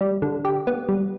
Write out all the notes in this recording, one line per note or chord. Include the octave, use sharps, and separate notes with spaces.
G3
D3
G4
B3
G3